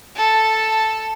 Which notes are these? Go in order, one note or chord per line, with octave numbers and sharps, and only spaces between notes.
A4 A5